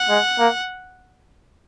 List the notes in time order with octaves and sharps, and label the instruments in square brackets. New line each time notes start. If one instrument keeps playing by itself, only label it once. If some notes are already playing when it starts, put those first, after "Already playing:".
Already playing: [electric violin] F#5
[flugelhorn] G#3
A#3